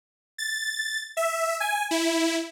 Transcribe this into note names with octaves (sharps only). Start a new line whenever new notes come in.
A6
E5
G#5
E4